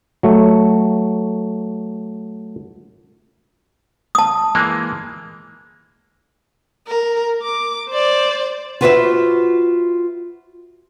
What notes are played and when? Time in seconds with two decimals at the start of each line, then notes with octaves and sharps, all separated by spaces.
0.23 F#3 A3
4.15 A5 D#6
4.55 E3 G#3 A#3
6.88 A#4
7.43 D6
7.89 C5 D5
8.81 F4 F#4 B4 C5 D5 E5